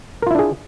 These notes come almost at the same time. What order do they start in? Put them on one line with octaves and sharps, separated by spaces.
A#4 F4 E4 D4 G#4